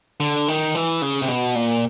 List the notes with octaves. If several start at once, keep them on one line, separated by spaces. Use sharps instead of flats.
D3
D#3
E3
C#3
C3
B2
A#2